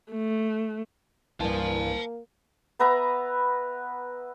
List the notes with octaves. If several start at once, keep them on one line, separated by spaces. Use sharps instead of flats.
A3
C2 G2 E3 A#3 F5 A5
B3 B4 E5 A#5